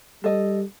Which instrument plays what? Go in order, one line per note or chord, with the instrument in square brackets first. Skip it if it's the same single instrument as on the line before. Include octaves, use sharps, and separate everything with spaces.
[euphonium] G3 [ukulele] A4 D#5